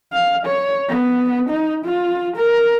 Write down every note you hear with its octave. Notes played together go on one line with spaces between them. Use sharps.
F5
C#5
B3
D#4
F4
A#4